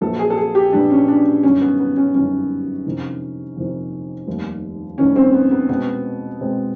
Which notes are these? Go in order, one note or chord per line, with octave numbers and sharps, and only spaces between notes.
A#1 A#2 F#3 B3 A4
G#4
A4
G#4
G4
A#1 A#2 F#3 B3 D4
C#4
D4
G1 F#2 D#3 C#4
B3
B3
C#4
G1 F#2 D#3 C#4
F2 C3 D#3
F2 C3 D#3
F1 D#2 D#3 G3
F1 D#2 D#3 G3 C#4
C4
B3
B3
B2 G#3 B3 C4
B2 G#3 C4